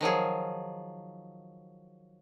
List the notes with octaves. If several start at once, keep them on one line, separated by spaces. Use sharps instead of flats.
D#3 F3 F#3 G#4